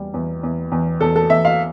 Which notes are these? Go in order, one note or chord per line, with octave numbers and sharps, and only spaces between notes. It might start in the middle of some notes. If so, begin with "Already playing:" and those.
Already playing: E2 G3
E2
E2
E2
E2 A4
A4
E2 E5
F5